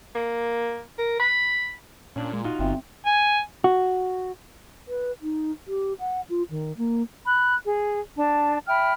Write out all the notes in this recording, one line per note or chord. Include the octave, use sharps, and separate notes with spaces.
A#3
A#4
B5
A#2 C#4 D4
G#3
D#4 F4 F#4
G1 C4 E5 G5
G#5
F#4
B4
D#4
G4
F#5
F4
D#3
A#3
B5 F#6
G#4
D4 A5
E5 G5 B5 F6